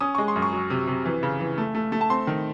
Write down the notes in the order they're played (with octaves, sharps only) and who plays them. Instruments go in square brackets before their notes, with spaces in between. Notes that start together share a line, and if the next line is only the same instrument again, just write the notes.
[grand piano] C#4 D#6
G#3 C#6
C6
F#2
C#6
F#3
C3
C3
E3
C#3
E3
A3
A3
A3
A5
C4 C6
D#3